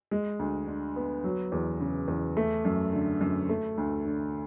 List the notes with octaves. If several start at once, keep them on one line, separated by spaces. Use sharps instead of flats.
G#3
D2
D3
B3
F#3
E2
C#3
E2
A3
F#2
D3
F#2
A3
D2
D3